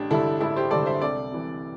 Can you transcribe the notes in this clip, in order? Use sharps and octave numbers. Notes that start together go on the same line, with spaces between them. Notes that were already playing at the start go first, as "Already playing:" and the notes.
Already playing: A1 D4 G4
G2 D3 E4 A4
A1 E4 A4
G4 C5
G2 D3 A4 D5
C5 E5
C2 A4 D5
C3 E3